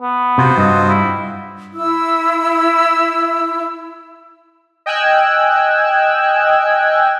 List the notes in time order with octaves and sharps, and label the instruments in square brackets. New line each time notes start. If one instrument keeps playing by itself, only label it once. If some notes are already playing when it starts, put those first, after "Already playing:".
[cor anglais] B3
[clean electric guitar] C3 [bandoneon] F4 F#4 C5
[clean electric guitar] G2 [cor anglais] D#5
[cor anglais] E4
[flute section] E4 E6
[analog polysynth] D#5 G5 G#5 E6 F#6 G#6